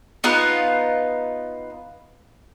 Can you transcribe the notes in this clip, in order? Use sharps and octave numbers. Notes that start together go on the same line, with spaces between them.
B3 D#4 F4 B4